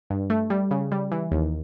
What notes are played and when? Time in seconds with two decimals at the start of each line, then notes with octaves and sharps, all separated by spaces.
0.10 G2
0.30 A3
0.50 G3
0.71 C#3
0.92 G3
1.11 E3
1.32 D#2